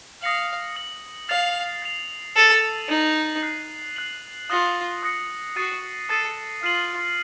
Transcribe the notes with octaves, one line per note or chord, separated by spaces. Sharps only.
F5 D#6 A#6 C#7 F#7
D#6 A#6 C#7 F#7
F5 A6 C7 F7
A6 C7 F7
A4 A6 D#7 F#7
D#4 A6 D#7 F#7
F#6 C7 F#7
F#6 C7 F#7
F4 D#6 F#6 A#6 C#7
D#6 F#6 A#6 C#7
F#4 D#6 A6 C7 D#7
A4 D#6 A6 C7 D#7
F4 F6 C7 D#7 F#7